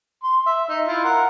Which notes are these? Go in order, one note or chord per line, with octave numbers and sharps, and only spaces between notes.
C6
E5
D#4
E4 F4
A#4 F#5